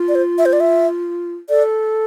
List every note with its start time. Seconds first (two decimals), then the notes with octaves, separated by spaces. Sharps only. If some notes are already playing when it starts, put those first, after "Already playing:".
Already playing: F4
0.08 D5
0.15 C5
0.38 E5
0.46 C5
0.53 D5
0.60 E5
1.49 A4 D5